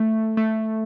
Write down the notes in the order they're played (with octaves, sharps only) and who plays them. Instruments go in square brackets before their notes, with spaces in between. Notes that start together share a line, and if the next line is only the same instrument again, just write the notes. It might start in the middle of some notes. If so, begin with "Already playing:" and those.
Already playing: [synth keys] A3
A3